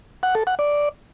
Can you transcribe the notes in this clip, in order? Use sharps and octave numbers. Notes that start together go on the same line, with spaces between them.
F#5
A4
F#5
D5